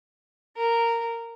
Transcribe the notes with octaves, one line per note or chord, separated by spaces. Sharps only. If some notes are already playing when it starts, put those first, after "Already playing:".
A#4